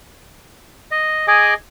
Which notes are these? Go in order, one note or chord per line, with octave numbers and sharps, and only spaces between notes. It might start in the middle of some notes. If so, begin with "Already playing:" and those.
D#5
G#4 D#5 G#5 D6